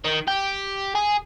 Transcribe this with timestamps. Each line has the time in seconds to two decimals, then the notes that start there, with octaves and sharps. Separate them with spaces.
0.04 D#3
0.28 G4
0.95 G#4